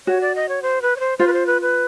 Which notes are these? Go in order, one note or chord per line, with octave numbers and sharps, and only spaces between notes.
F#4 C#5
D5
D#5
C#5
C5
B4
C#5
C5
F4 C5
B4
C5
B4
B4